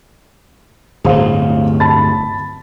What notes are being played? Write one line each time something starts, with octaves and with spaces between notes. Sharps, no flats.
D1 G1 A2 G#4 C5 F5
A5 B5 A6